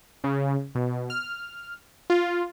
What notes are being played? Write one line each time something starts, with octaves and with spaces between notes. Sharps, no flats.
C#3
B2
F6
F4